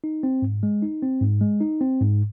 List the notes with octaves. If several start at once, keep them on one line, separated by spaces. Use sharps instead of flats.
D#4
C4
G#2
G#3
D#4
C4
G#2
G#3
D#4
C4
G#2